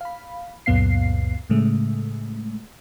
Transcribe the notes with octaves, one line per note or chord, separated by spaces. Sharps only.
F5 B5
C#2 F#2 A#2 B3 F5 C7
A2 C#3 G#3 A3